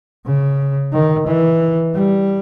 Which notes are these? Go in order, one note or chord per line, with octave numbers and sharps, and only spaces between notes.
C#3
D#3
E3
G3